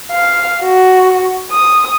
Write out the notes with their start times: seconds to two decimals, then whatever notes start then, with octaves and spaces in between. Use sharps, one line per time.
0.12 F5
0.63 F#4
1.51 D#6